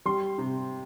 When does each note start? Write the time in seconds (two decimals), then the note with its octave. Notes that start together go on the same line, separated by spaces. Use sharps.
0.05 G3 C6
0.38 C3